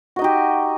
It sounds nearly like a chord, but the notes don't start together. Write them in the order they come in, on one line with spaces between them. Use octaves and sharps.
F#4 D#5 D#4 G4